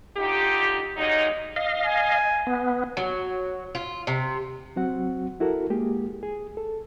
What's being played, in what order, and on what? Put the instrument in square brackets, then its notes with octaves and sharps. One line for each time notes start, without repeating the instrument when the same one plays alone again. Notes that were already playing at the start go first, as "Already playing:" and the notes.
[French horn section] D3 D#4 F4 G4
A#2 F#3 G#3 D#4
[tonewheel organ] D#5 F5
[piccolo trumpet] G#5
[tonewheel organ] B3
[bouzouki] F#3
F4
C3
[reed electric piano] F#3 C4 F#4 F#5
E4 F#4 A4 A#4
G#3 A#3 G4 G#4
G#4
A4